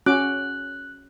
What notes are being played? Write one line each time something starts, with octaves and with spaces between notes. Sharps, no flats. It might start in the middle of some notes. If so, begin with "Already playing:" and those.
C#4 F#4 D6 F#6